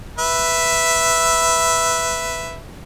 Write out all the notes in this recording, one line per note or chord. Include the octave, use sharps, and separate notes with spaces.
B4 E5